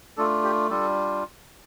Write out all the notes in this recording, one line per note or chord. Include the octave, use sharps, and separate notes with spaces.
A3 D4 F4 A4
G4
G3 D4 F4 A4